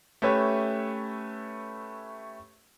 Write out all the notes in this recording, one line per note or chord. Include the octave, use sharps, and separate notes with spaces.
A3 C#4 G4 B4 C#5 E5